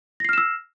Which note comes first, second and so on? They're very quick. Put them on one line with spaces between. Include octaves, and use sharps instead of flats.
A#6 C7 F6 E7 E6